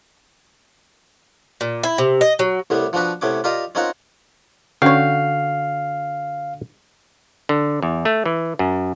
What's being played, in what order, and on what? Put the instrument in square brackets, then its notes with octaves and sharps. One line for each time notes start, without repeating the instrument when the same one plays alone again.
[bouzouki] A#2
E4
C3
D#5
F#3
[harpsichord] C2 A2 G3 B3
F3 B3 D4 F#4 B4
A2 C3 B3 C#4 D6
F4 G4 A#4 D5 D#5 F5
C4 C#4 D#4 F4 A#4 F#5
[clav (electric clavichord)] D3 F#4 G5 [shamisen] C#4 C#5 [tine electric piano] F5
[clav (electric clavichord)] D3
E2
A3
E3
F#2